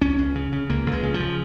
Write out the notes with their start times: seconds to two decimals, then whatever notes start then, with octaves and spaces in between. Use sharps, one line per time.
0.01 C#2 C#4
0.19 C#2
0.35 C#3
0.52 C#3
0.70 C#2 A#3
0.86 C#2
0.92 G#3
1.03 C#3
1.14 F3
1.20 C#3